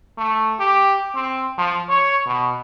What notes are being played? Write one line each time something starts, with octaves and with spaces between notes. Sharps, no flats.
A3
G4
C4
F3
C#5
B2